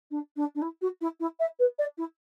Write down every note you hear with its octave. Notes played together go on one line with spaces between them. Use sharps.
D4
D4
D4
E4
F#4
E4
E4
E5
B4
D5
E4